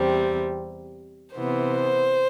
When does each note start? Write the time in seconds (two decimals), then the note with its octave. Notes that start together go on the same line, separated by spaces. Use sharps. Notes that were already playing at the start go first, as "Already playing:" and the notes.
Already playing: E2 C3 G3 C4
1.35 C3 E3 B3 C5